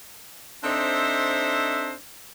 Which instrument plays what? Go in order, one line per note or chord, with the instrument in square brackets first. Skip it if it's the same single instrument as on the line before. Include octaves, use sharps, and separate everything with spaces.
[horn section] C4 D4 D#4 A4 C5 E5